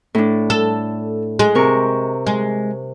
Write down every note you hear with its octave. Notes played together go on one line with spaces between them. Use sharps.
A2 D4
A4
G#3
C3 A#4 C#6
G#3